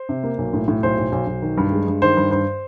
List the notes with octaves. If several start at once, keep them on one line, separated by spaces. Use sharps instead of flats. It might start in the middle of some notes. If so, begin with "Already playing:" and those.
Already playing: C5
C3
A#3
B1
A2
A2
B1 C5
B1
B1
B1
D#3
G2
G#3
G2
D#3 C5
G2
G2 C5